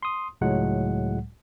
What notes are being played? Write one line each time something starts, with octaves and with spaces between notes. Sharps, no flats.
C6 D#6
C#2 A2 F#3 G#3 F#5